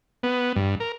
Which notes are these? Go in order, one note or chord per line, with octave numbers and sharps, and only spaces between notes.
B3
G2
A#4